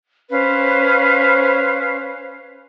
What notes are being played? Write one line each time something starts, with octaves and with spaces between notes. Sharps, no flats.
C#4 B4 C5 F5